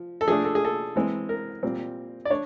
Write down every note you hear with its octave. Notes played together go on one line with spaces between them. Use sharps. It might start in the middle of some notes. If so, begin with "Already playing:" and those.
Already playing: F3
A4
F3 A3 D4 G#4
A4
G#4
A4
E3 G#3 C4
A#4
A#2 G3 C4
D5
D4 C#5